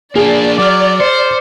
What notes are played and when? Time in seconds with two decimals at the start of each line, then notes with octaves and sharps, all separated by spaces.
0.16 A#3 D4 G#4 D5
0.58 F#3 D6 F6
1.00 C5 C#7